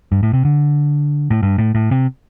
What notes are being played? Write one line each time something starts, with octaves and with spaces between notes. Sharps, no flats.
G2
A2
C3
D3
A2
G2
A2
A2
C3